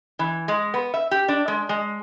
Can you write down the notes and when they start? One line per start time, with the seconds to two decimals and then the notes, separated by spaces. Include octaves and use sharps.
0.19 E3
0.48 G#3
0.74 B3
0.94 E5
1.11 G4
1.28 D4
1.48 G#3
1.69 G#3